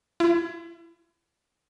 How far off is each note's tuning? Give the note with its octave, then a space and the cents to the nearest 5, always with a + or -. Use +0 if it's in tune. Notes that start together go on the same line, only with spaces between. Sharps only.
E4 +35